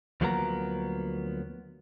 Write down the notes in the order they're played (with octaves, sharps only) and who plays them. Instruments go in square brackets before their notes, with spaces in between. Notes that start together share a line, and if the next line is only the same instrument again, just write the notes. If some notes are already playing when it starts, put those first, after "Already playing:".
[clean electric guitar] D2 F3 F#3 A#3 B3 A#5